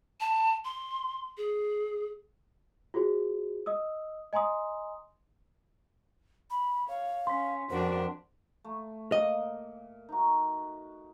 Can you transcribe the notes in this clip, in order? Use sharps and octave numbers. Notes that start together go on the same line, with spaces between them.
A5
C6
G#4
F4 F#4 G#4 C5
D#5 D#6 E6
D#5 G#5 A#5 C6 D#6
B5
C#5 F5
C#4 C6 B6
F2 D4 F#4 A#4 C5
A3
A#2 D#5
D#4 F#4